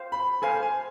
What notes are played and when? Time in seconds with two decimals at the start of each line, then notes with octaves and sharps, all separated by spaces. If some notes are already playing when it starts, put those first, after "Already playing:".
Already playing: C5 F5
0.12 B5
0.42 A4 C5 F5 G#5
0.63 G#5